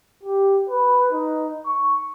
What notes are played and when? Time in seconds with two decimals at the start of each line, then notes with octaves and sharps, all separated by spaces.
0.23 G4
0.70 B4
1.13 D#4
1.67 C#6